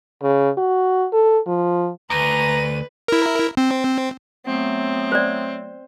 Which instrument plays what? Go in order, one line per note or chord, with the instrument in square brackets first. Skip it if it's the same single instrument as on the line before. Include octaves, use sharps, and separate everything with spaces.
[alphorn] C#3
F#4
A4
F3
[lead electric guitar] D2 [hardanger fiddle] B4 [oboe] A#5 [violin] D#7
[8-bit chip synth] E4 A#4
C4
[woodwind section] F#3 A3 B3 [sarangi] C4
[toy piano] C5 D5